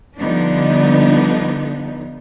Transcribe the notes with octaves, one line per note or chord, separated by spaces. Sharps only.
D3 F3 G3 B3 D4 D#4